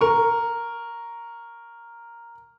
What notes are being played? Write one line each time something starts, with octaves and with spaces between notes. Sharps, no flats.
A#4 C#6